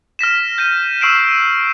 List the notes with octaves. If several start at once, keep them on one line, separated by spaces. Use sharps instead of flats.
F6 A#6 B6 E7
G6 A#6 D#7
C#6 E6 F6 C7 D7 E7